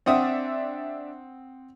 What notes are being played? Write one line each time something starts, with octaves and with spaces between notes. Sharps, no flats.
C4 D4 D5 E5 F#5 D#6